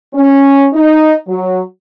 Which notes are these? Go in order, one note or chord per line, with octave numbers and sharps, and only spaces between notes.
C#4
D#4
F#3